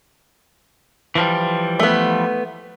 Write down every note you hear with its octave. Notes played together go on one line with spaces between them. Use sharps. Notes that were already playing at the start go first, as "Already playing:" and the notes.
E3 F3 G3
A3 B3